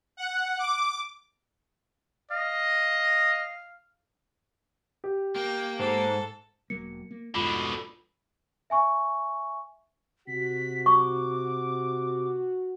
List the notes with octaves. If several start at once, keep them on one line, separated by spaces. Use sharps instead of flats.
F#5
D6
D#5 F5
G4
A#3 G5
G#2 A4 C5
E1 F#3 A#3 C#7
A#3
C2 F2 G#2 B2 D3 F4 B5 E7
E5 G#5 C#6
C3 F#4 B6
C#6 D6